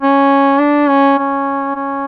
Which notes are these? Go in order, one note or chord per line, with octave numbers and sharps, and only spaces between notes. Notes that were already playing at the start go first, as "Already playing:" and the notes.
C#4
D4
C#4
C#4
C#4